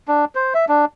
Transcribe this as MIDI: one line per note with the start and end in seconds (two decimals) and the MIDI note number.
0.08 0.25 62
0.35 0.54 72
0.54 0.65 76
0.69 0.85 62